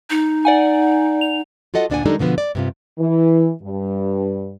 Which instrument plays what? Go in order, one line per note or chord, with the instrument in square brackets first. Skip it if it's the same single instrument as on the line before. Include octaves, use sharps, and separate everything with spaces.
[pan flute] D#4
[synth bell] D5 F#5 G#5
F7
[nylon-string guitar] F4 F#4 A4 D#5 F#5
D2 A#2 D4 D5 F#5 G#5
D#3 G3 G#3 D4 D#4 A4
B2 D3 F3 B3
D5
G2 C3 F4
[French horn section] E3
G2